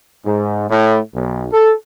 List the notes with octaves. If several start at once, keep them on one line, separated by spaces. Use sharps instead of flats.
G#2
A2
B1
A4